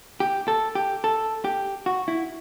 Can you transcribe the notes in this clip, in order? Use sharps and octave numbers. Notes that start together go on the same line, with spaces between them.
G4
A4
G4
A4
G4
F#4
E4